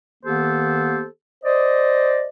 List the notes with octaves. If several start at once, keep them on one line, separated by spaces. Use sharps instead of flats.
D#3 A#3 B3 G4 A4 C5
C5 D5 D#5